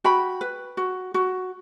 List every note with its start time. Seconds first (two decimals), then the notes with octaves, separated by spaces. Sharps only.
0.04 F#4 G5 B5
0.41 B4
0.77 F#4
1.14 F#4